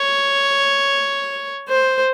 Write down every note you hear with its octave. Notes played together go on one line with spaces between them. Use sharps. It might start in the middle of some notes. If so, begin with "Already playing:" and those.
Already playing: C#5
C5